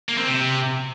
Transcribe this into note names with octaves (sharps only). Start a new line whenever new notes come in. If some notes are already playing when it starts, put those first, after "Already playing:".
A#3
C4
C3